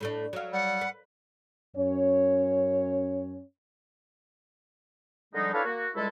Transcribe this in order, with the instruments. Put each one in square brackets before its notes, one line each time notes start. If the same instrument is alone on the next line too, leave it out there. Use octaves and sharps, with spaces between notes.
[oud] A2 A3 D4
F#3 F5
[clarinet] G3 [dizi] F#5
[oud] B4
[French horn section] F#2 C#4 C#5
[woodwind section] D3 F3 G3 G#3 D#4
D4 E4 A4 B4 C#5 F5
A#3 F#4
C#2 G3 G#3 E4 A4